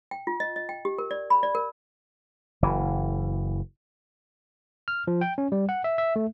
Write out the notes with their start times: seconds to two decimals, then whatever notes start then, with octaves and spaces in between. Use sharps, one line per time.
0.11 G5
0.27 F4
0.40 D#5
0.56 D#5
0.69 G5
0.85 G4
0.98 A#4
1.11 D5
1.30 B5
1.43 D5
1.55 A#4
2.62 F#1 E3
4.88 F6
5.07 F3
5.21 G5
5.38 C#4
5.52 G3
5.69 F#5
5.84 E5
5.98 E5
6.16 A3